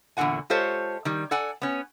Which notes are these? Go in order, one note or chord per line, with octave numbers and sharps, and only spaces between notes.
E2 A#2 D3 F#4 F#5 G#5
G#3 F4 G4 A4 C5 C#5
D#3 G3
A4 D5 F#5 G#5
B3 C#4